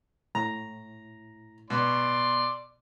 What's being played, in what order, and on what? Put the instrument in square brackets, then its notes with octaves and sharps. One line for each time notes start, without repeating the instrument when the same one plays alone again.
[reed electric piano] A2 [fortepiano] A#5
[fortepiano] B2 [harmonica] D5 C6